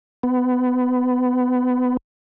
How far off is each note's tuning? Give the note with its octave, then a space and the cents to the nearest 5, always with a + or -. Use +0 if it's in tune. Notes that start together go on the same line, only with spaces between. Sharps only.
B3 +25